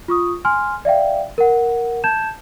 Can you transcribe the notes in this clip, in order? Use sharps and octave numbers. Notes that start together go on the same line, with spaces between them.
F4 C#6 D#6
G#5 C6 F6
D5 E5 F5 G5
A#4 F#5
A5 G6 G#6 E7